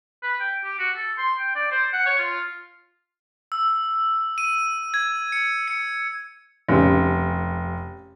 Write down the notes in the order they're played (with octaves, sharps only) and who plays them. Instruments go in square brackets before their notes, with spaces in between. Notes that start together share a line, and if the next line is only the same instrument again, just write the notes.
[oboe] B4
G5
G4
F#4
A4
C6
G5
D5
C5
F#5
C#5
F4
[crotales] E6
D#7
G#6
C#7
C#7
[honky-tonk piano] F1 [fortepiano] C#3 G3 C#4